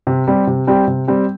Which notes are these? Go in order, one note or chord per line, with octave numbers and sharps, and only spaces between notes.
C3
G3 C4 G4
C3
G3 C4 G4
C3
G3 C4 G4